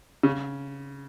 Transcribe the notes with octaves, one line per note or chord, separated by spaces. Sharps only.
C#3